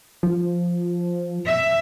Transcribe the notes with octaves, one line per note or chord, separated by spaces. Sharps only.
F3
E5